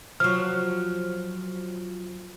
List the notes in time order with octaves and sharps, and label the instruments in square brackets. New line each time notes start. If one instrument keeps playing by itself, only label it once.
[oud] F3 F#3 [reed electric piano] F6